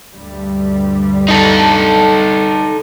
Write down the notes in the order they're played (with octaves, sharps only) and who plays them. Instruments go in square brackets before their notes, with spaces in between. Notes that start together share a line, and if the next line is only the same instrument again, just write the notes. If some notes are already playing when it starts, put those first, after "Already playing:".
[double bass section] D2 G2 G3
[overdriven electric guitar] D#4 A4